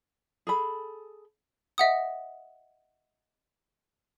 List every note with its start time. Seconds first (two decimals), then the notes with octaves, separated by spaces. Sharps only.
0.47 G#4 A4 B5
1.78 D#5 E5 F#5 D#6